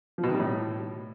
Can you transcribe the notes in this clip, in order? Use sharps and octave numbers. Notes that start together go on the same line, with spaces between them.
F3
B2
D#3
G3
A2